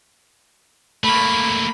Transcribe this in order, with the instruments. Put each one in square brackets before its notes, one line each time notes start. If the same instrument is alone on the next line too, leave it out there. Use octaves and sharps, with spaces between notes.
[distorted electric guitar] A3 A#3 [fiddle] B5